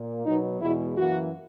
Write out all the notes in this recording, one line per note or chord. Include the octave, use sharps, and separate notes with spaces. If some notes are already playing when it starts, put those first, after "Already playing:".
Already playing: A#2 A#3
B2 F#3 B3 D#4
E2 B2 G#3 E4
F#2 E3 A#3 F#4